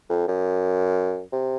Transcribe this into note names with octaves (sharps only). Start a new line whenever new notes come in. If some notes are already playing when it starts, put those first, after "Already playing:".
F2
F#2
C3